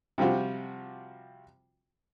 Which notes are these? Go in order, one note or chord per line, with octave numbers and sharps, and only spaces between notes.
C3 F3 G3 F4 F#4